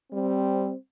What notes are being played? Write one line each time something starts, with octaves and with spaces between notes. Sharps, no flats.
G3 C4